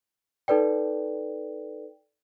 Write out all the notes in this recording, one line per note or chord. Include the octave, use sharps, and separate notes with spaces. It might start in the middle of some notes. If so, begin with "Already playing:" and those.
D#4 A4 B4 D5 G5